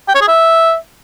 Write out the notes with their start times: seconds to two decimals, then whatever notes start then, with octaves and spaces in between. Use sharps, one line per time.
0.08 G5
0.15 C#5
0.21 G#4
0.28 E5